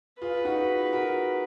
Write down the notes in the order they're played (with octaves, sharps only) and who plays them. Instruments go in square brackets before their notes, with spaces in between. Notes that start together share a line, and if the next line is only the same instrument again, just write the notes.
[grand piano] F4 G#4 [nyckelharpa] B4
[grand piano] D#4 F#4
F#4 A#4